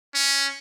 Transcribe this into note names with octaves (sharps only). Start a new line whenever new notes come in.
C#4